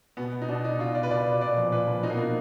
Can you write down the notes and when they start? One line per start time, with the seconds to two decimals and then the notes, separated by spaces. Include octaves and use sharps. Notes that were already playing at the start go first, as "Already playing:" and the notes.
0.17 B2 B3
0.42 D#4
0.49 B2 D4
0.65 D#4
0.79 B2 F4
0.95 D5
1.03 B4
1.10 B2 D5
1.41 A#2 D5
1.57 F3
1.72 A#2 B4
1.88 F3
2.03 B2 D#4
2.10 A#3
2.13 B3
2.23 D#4